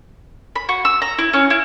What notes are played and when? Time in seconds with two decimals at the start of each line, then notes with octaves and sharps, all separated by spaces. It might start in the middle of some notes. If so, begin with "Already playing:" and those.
0.56 B5
0.69 F#4
0.85 E6
1.02 A#5
1.19 E4
1.33 C#4
1.50 E4